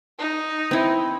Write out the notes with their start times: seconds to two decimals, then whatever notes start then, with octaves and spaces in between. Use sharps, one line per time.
0.19 D#4
0.71 C4 E4